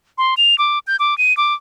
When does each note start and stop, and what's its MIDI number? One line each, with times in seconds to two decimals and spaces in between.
0.18 0.35 84
0.37 0.58 101
0.58 0.79 86
0.87 0.96 91
0.99 1.17 86
1.18 1.36 99
1.37 1.54 86